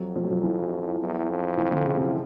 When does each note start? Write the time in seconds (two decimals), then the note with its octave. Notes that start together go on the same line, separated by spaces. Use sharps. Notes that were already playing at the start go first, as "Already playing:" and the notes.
Already playing: F2 F#3
0.16 F3
0.24 F#3
0.31 F3
0.43 E3
1.01 E2
1.29 F2
1.57 E3
1.71 D3
1.86 C#3
1.96 C3
2.01 C#3